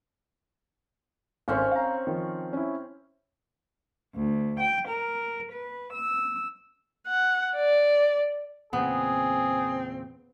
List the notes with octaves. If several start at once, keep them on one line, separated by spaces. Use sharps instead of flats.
G#1 C4 C#4 A4 C#5
F5 A#5
D#3 F3
C#4 E4
D2
G5
A#4
B4
E6
F#5
D5
E2 A#2 C#3 B3 C4 G#4